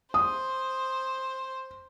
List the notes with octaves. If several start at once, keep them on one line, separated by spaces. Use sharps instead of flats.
C5 D#6